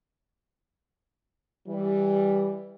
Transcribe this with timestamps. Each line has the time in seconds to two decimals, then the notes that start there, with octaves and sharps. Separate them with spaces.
1.68 E3 G3